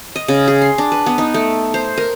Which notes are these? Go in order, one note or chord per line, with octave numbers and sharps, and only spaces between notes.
D#5
C#3
G#4
C6
D4
B4
B3
D#4
A3
C5
A#4